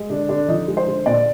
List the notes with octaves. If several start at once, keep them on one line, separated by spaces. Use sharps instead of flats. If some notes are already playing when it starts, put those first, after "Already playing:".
Already playing: G#3
D3 D4
D3 D4
F3 D#4
G#3
C5
D3
A#2 D5